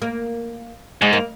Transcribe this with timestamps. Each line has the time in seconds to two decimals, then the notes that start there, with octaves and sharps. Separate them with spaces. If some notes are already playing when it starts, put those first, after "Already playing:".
0.02 A#3
1.02 G#2 G#3
1.13 A#3